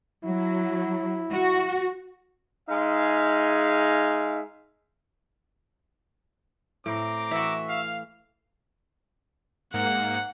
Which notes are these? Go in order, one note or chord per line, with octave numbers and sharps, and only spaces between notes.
F#3 E4
F#4
G#3 D#4 G#4 E5 F5
A2 C4 A#5 D6
E3 F#4 E5
F5
G#2 A#3 F#5